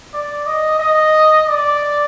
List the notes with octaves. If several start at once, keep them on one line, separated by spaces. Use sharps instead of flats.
D5
D#5
D#5
D5